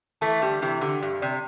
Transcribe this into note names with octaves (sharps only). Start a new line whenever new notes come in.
E3 A3 A5
D3 G3 G4
C3 E3 G4
D3 G4
G2 G4
C3 D5